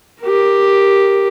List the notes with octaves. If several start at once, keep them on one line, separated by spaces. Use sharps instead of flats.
G4 A#4